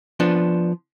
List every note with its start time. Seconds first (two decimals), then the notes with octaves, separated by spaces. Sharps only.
0.20 F3 B3 D4